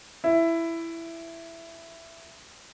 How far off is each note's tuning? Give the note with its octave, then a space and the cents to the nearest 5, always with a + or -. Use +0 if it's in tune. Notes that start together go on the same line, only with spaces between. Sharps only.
E4 +10